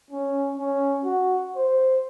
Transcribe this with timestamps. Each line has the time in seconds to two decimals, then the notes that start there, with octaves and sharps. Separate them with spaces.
0.10 C#4
0.57 C#4
1.05 F#4
1.56 C5